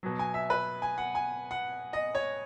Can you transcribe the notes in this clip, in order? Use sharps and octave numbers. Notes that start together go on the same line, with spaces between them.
B2 F#3
G#5
E5
B4
G#5
F#5
G#5
F#5
D#5
C#5